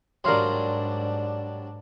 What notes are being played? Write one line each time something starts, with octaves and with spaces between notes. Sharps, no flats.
G#2 F#3 G3 D4 A#4 F5 C6